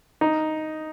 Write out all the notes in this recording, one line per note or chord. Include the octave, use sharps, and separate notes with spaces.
D#4